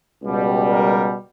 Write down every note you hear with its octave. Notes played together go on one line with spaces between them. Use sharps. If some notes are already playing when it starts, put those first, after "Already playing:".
C#2 B2 G3
A#4